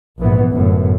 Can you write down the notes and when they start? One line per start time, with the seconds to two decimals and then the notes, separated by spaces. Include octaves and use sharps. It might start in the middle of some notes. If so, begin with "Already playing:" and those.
0.18 A#1 G#2 E3 B3
0.51 G1 F#2 A2 B3